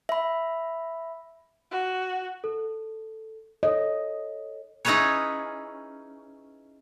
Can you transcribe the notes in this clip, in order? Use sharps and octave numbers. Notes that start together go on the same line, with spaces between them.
E5 B5
F#4
A4
A4 C#5 D#5
C#4 D#4 E4 G#4 B4 C#5